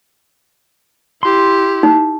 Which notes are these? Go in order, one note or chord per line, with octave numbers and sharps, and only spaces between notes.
E4 G4 C6
D#4